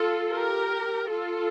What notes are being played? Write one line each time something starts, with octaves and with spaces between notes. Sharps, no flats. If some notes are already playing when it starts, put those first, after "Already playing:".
Already playing: F4 A4
G4 A#4
F4 A4